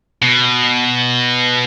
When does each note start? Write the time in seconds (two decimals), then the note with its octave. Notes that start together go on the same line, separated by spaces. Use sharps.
0.22 B2